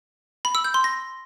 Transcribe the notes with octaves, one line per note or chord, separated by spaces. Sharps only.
B5
E6
G6
C6
A#6